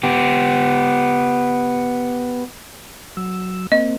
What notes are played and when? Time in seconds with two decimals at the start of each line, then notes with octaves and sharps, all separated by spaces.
0.03 B3 G4
3.17 F#3 E6
3.72 A#3 C4 D#5